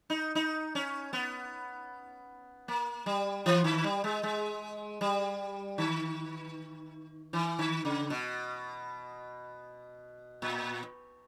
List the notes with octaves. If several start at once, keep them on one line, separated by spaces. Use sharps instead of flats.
D#4
D#4
C#4
B3
A#3
G3
E3
D#3
G3
G#3
G#3
G3
D#3
E3
D#3
C#3
B2
A#2